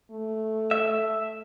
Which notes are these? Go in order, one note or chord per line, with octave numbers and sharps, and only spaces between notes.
A3
E5